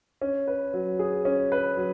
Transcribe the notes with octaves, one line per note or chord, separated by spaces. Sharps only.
C#4
B4
F#3
G#4
C#4
B4
F#3